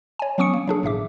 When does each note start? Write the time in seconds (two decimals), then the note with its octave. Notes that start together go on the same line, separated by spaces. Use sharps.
0.19 C#5 G#5
0.38 F#3 B3 C#4 C#6 D#6 C#7
0.53 A#3
0.68 F#3 D4 G#4
0.83 G#1 A2 E5 D6